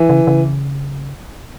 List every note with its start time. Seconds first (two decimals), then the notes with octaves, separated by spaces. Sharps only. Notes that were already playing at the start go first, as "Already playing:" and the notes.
Already playing: E3
0.09 C#3
0.27 C#3